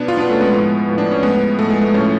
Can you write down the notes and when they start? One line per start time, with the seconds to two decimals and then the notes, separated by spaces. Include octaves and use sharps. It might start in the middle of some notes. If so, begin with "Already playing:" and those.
Already playing: B2 B3 D4
0.08 F4
0.17 B2 B3 D4
0.29 A3 C#4
0.41 G#3 B3
0.53 A2 F3
0.89 A2 F3
0.98 D4
1.11 C#4
1.23 A2 F3 G#3 B3
1.59 A2 F3 A3
1.70 G#3
1.82 A3
1.94 A2 F3 A3 C#4